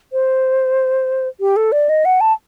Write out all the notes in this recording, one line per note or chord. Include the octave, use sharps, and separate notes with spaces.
C5
G4
A4
D5
D#5
F#5
A5